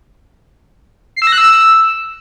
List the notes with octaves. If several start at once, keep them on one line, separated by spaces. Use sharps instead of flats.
C7
E6
A#6
F#6
E6